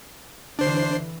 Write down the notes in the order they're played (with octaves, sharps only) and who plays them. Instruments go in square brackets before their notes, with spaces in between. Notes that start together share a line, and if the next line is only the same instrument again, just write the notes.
[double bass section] D3 E3 [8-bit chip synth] D4 C5 C7